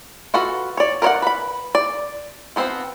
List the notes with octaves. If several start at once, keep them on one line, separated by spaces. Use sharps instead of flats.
F4 F#4 A4 B4
C#5 D5
A#4 B4 C#5 D5 F#5
B4 B5
D5
F3 B3 C4 D#4 C5